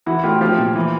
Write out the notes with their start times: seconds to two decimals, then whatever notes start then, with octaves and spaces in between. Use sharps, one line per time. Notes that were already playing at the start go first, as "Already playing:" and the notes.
0.06 E3 E4 F#4
0.24 A2 F4 G4
0.41 F3 F4 G4
0.58 A#2
0.76 E3